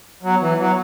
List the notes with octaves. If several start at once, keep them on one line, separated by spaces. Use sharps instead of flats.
F#3 B3
E3
F#3